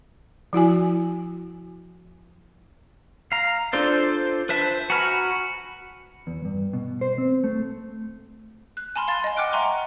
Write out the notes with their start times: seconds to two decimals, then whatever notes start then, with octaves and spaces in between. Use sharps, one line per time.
0.53 F3 E4 F#4 G#5
3.32 F5 A#5
3.73 D4 F4 A4 C5 D5
4.49 B4 C5 E5 A5
4.90 F#4 G#5 A#5 B5 F6
6.27 E2
6.45 G2
6.73 B2
7.01 C5
7.18 C4
7.44 A3
8.77 F#6
8.96 G#5 A5 B5 C6 F6
9.08 F5 C6 A6
9.24 D#5 G#5
9.37 F#5 G5 D6 F6 F#6 D7
9.52 E5 F#5 G#5 A#5 C6 C#6